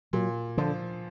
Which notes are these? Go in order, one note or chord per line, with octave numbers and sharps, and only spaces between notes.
A#2 F#3
D3 F3